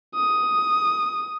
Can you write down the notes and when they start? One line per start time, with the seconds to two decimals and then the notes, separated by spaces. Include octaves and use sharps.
0.15 D#6